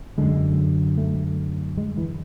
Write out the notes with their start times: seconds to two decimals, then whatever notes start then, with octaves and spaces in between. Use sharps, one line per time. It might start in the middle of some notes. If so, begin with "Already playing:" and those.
0.18 F#2 D3 G#3
0.98 A3
1.77 G#3
1.98 E3